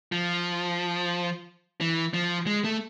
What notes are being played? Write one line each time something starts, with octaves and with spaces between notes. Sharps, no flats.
F3
E3
F3
G#3
A3